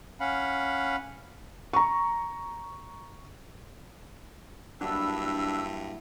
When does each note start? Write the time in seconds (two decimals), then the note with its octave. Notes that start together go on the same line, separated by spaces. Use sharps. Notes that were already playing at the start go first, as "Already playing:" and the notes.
0.20 C#4 F5 F#5 B5
1.73 A#5 C#6
4.81 G2 F#3 A#3 D4 E4 E6